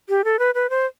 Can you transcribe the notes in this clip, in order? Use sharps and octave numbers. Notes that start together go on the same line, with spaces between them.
G4
A4
B4
B4
C5